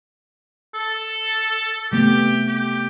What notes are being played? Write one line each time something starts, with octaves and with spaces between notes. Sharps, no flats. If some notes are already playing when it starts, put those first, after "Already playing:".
A4
C3 A3 B3 G4
G4